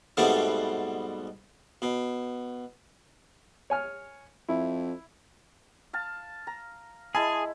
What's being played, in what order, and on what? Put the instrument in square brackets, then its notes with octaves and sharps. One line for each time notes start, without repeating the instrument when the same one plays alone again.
[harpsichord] G#2 B2 G3 A3 B3 C4
B2
[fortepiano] C#5 G#5 F6
[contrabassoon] F2 [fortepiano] E4
[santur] F5 A5
A#5
[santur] G#3 E4 B5 [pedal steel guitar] G#4 [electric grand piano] G#5 A5